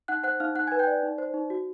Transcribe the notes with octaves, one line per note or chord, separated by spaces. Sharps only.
D#4 F#5 F#6
C5 F#5 F#6
D#4 F5 F6
D#4 F#5 F#6
G#5 G#6
B4
G5 G6
D5
D#4
C5
D#4
F#4